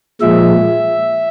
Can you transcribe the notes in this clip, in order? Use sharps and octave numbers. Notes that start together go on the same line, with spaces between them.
A#2 F3 G#3 E5